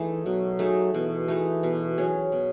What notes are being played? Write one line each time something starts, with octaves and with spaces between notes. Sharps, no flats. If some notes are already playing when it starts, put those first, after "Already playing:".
Already playing: E3 A3 D#4 G#4
B2 F#3
A3 D#4 G#4
B2 E3
A3 D#4 G#4
B2
F#3 C#4 G#4
B2